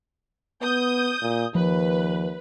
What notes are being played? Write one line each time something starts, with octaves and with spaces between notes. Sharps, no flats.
B3 D#6 G6
A#2
D#2 F3 B4